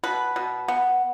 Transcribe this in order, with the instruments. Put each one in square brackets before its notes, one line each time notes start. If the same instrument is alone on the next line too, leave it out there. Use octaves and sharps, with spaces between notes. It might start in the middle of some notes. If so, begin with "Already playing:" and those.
[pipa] B2 B4
B2
B3